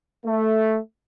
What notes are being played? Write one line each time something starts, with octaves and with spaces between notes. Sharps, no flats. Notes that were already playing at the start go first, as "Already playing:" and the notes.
A3